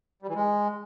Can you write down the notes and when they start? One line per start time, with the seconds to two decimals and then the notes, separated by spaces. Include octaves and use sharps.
0.22 G3
0.29 E3
0.35 G#3